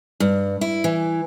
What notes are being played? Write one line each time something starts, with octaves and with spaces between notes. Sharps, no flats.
G2
E4
E3